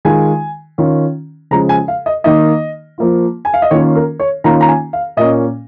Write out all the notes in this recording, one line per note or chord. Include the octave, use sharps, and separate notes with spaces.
D#3 G#3 F4 G#5
D#3 C#4 F4
C#3 F3 G#3 A#5
G#5
F5
D#5
D#3 A#3 D#4 D#5
F3 A#3 F4
G#5
F5
D#5
D#3 A#3 C#4 F4 C#5
A#4
C#5
D#3 A#3 C#4 F4 A#5
A#5
G#5
F5
A#2 A#3 C#4 D#5